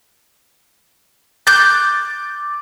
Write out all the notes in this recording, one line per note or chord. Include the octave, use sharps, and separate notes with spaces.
D6 F#6 G6 A6